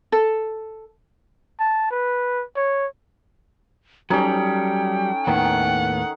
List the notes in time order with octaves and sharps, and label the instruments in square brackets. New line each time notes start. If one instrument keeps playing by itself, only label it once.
[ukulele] A4
[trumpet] A5
B4
C#5
[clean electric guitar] F#3 G3 [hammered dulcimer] C#4 D#4 A4 [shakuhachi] G5
[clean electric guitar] D#2 A2 B3 [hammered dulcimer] D#3 [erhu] F#5